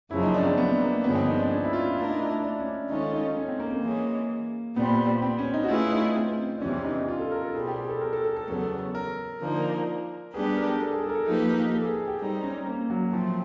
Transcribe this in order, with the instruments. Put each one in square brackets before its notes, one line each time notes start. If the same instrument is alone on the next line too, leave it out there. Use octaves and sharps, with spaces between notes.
[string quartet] F#2 C#3 F3 A#3 [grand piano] E4
[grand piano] D#4
D4
C4
B3
A#3
[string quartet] G2 D3 F3 G#3 C#4 [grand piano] B3
[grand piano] C4
D#4
D4
C#4
E4
F4
[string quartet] A3 D4 F4 A#4 [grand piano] E4
[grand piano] D#4
E4
D4
C#4
[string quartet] D#3 G#3 C#4 F4 A4 [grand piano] D#4
[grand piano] D#4
C#4
C4
A#3
A#3
[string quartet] E3 G#3 C#4
[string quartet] A#2 G3 C4 [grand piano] B3
[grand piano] C4
C#4
D#4
F#4
[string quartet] A3 C#4 E4 G#4 B4 [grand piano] F4
[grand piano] D#4
C4
D4
[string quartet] E2 C3 E3 G3 [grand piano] C#4
[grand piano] D#4
F4
A4
A#4
A4
[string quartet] B2 G3 C4 [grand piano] G#4
[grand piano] G4
G#4
A4
A#4
A4
A4
A4
[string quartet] E2 C#3 F#3 B3 [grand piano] A4
[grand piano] A#4
[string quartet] D3 F3 A#3 D#4
[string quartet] G3 B3 D4 G4 B4 [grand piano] G#4
[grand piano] A#4
A4
G#4
A4
A#4
A4
[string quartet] F3 A#3 D#4 G4 B4 [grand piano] A4
[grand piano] A#4
A4
G#4
G#4
G4
[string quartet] G3 C4 D#4
[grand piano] C#4
A#3
F#3
[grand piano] F3 [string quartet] F#3 A3 C4